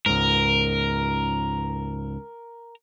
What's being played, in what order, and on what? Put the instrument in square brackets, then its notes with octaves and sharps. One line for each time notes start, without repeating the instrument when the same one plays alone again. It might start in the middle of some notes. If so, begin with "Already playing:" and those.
[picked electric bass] C#2 G#2 [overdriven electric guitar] A#4